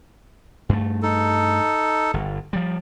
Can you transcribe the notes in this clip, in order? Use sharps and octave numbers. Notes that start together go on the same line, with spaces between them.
G2 A3
D#4 A4
G1
F3 G3